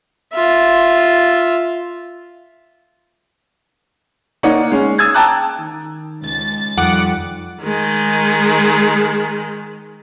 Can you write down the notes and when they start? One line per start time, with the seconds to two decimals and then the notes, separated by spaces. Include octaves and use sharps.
0.33 F4 E5
4.43 A#3 D#4 C#5 D5 F#5
4.71 G#3 C#4
4.98 D#6 E6 G#6 A6
5.14 G5 A5 A#5 D6 E6 F#6
5.59 D#3
6.22 C#2 A6
6.78 F2 D#3 G3 F#5 D6 D#6
7.63 D#3 G#3